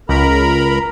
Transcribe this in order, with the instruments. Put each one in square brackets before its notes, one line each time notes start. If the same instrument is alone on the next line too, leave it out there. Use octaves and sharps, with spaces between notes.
[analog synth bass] C#2 [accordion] A#4 A#5 B5